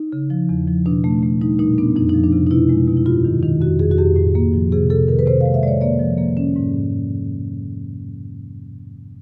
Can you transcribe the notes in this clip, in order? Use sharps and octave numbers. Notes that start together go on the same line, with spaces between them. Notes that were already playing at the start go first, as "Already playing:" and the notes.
Already playing: D#4
C#3
F3
E2
F3
B2 D4
A3
A3
G3 D#4
A#2 D#4
B3 D4
F2 D#4
F3 D#4
D4
C3
D#4
B2 E4
G#3
B2
E4
G2 F4
D#3
D#3
F2 F#4
F2 G#4
F#4
F2 G4
A2
A#3
F3
C3 G#4
C3 A4
D#3 A#4
B4
C3 C5
G#3 F5
E5
G#3 C#5 D5
A#3 D5
F3
A#3
C#4
G#2